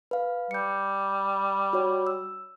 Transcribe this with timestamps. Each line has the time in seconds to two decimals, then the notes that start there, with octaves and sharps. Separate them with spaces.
0.11 B4 F5
0.51 G3 G6 C#7
1.73 F#4 C#5
2.07 E6